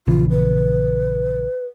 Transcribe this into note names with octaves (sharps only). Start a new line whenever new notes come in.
A#1 C#3 E3 F4
B4